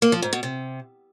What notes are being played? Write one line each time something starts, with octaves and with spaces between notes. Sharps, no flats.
A#3
F3
G#2
B2
C3